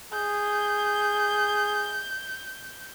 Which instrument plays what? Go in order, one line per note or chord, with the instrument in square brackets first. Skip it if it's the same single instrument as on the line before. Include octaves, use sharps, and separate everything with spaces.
[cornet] G#4 [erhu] G6